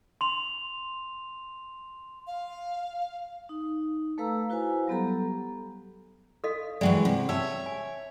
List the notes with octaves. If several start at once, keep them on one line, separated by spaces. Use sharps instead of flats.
C6 F7
F5
D#4
A3 A4 B4 F5 A#5 E6
E4 F#4 B4 C5 F5 G#5
F#3 G3 B3 G4 A4 A#5
A4 D#5 F5
E3 F#3 G#3 D5 E5 G5
C3
C#5 E5 G5 A5 E6
G#5